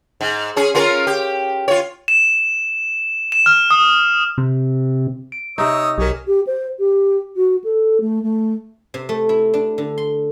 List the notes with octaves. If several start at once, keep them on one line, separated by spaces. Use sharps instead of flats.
G#2
C#4 G#4
C#4 F4 A#4
G4
F4 C#5
E7
E7
F6
D#6
C3
D7
C3 D#4 C#5 D#6 E6
B1 F#3 G4 A#4 C#5 G#5
G4
C5
G4
F#4
A4
A3
A3
C3
A3
E4
D4
D3
C6